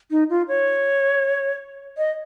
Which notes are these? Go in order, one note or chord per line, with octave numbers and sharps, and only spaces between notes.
D#4
F4
C#5
D#5